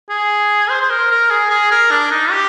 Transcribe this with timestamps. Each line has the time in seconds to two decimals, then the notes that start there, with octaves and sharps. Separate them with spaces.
0.09 G#4
0.69 C5
0.82 C5
0.90 A#4
1.10 A#4
1.30 G#4
1.50 G#4
1.71 A#4
1.91 D4
2.11 D#4
2.31 G4